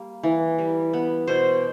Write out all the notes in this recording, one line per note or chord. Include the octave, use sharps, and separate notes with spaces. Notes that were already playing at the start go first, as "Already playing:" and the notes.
Already playing: G3 A#3
E3
G3
B3
B2 C5